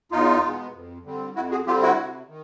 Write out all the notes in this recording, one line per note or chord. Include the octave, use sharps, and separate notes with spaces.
E2 D#4 F4
B2 G#3 B3
F2
D3 G3 C4
F2 E4 F#4
F#4 G#4
D3 G3 C4 F4 G4
E4 F#4
C3
D#3